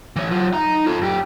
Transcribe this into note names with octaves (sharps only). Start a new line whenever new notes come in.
E3 C#5
F#3 F4
D#4 A#5
F4 A4
F#2 G4